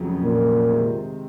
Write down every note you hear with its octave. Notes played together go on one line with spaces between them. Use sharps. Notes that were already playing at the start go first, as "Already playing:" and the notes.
Already playing: F1 F2 C#3 F#3
A#2
C3 D#3 G#3 C4